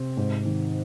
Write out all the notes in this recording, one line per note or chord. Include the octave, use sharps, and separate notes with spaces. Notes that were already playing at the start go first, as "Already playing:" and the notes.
Already playing: C3 C4
G#2
D#3